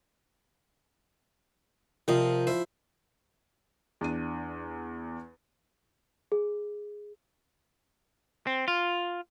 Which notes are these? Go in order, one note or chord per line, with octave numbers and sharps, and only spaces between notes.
C3 F3 A#4 C5 D#5
E4 C5
E2 D4 D#7
G#4
C4
F4